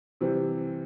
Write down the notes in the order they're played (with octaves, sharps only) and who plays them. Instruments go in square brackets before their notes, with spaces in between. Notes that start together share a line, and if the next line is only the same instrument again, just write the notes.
[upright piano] C3 E3 G3 C4